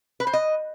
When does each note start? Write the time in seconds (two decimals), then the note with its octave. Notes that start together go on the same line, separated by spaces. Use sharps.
0.20 B4
0.27 C5
0.33 D#5